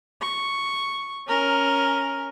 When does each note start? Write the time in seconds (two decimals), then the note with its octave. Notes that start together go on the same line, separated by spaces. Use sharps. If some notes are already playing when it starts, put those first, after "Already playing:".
0.22 C#6
1.28 C#4 A#4